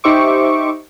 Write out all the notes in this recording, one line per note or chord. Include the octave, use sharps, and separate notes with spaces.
D#4 G4 C5 E5 C#6 D6